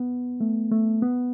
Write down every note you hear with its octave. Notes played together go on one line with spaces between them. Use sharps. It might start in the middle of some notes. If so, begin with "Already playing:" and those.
Already playing: B3
A3
A3
B3